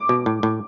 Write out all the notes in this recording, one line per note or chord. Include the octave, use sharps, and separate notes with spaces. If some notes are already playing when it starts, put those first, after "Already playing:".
Already playing: D6
B2
A2
A2